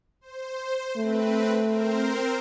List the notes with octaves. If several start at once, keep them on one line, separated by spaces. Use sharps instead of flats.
C5
A3 C4 B4
C4 A#4 C5